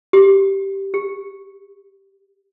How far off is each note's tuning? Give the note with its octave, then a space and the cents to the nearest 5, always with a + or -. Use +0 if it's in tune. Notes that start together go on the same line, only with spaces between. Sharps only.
G4 -5
G4 +45